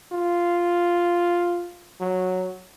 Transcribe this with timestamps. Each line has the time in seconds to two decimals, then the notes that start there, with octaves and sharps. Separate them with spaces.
0.12 F4
2.00 F#3